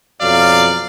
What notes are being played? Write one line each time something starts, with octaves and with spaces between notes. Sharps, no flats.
F2 B2 F#3 D5 F5